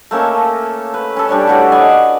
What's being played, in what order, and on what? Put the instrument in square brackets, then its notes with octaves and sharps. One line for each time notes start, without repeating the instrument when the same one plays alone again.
[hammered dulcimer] A3 A#3 C#4 A4
B4
C#4 A4
G3 D4 C#5 D5
A2 F#4 G4 F#5
B4 D5 D#5 G#5